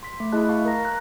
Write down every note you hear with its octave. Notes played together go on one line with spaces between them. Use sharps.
C6 B6
A3
A3 E4 G#4 D#5 A5 F#6
F5 A5 C#6
A#4 A#5 A#6
A#5 F#6 G6